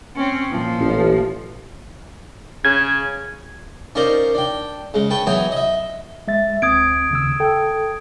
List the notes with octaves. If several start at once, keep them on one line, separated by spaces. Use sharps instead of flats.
C4 C#4
A#2 F3
A1
C#3 G#6
C#4 D#4 F4 A#4 C5 D5
D4 G5
C#3 G#3
B4 G5 A5 C#6
E3 F#3 B3 G5 G#5 D#6
D#5 E5
G#3 E5 A6
D2 C4 D#6 G#6 D7
D#2 C#3 E6
A4 G5